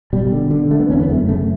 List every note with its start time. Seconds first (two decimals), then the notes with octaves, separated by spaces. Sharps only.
0.13 B2 G3
0.32 D3
0.51 D3
0.71 D3 A3
0.80 B3
0.90 E2 C#4
1.00 B3
1.09 F#2 A3
1.29 C#3 A3